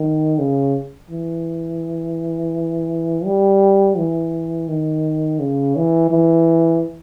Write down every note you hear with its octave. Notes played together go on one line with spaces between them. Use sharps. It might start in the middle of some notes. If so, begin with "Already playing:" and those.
Already playing: D#3
C#3
E3
G3
E3
D#3
C#3
E3
E3